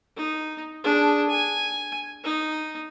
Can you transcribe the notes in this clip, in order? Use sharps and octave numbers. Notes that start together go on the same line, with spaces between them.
D#4
D4 G#4
G#5
D#4